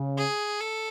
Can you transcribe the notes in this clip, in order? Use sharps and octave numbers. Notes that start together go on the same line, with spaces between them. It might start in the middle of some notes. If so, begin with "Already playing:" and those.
Already playing: C#3
G#4
A4